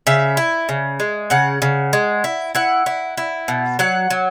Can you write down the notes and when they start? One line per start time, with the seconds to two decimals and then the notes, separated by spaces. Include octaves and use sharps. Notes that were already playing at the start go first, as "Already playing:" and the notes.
0.07 C#3 E5
0.37 E4
0.69 C#3
1.00 G#3
1.30 C#3 F#5
1.62 C#3
1.93 G#3
2.24 E4
2.55 E4 F#5
2.86 E4
3.17 E4
3.48 B2
3.79 F#3 F#5
4.10 F#3